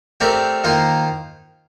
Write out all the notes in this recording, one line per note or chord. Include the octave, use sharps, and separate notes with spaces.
A3 C4 G4 A#4 D5
D#3 A#3 F4 C5